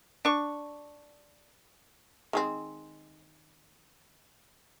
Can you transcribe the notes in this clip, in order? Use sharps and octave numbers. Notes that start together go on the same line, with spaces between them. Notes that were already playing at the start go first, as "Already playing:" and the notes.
D4 C#6
D#3 G#3 C4